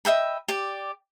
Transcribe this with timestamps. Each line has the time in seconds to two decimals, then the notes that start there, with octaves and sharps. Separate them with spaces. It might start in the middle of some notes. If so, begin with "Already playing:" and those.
0.05 D#5 E5 G5 B5
0.48 G4 D5